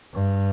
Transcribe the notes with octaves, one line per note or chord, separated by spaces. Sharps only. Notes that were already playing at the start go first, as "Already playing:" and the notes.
G2